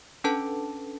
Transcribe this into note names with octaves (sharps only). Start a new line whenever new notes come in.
C#4 D4 A4 B4 A5